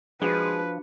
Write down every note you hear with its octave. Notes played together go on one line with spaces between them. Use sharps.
F3 G#3 D4 F#4 B4